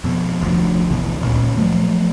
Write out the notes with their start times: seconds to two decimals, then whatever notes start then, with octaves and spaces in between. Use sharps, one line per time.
0.04 F2 B2
0.41 F1 D2 F3
0.90 A1 D2 B2 E3
1.21 D#1 C#2 A#2 C#3
1.57 F3 F#3 A3